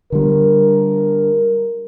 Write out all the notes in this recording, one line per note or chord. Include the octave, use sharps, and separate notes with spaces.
D3 G3 A#4